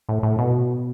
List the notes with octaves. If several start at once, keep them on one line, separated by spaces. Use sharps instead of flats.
A2
A2
B2